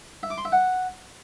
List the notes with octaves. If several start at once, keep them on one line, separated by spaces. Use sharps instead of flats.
E5
D6
C6
E5
F#5